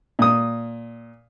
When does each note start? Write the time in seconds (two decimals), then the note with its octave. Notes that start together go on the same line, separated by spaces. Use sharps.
0.19 A#2 D#6